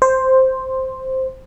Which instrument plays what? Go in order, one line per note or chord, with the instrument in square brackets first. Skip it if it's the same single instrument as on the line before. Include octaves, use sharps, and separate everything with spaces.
[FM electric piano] C5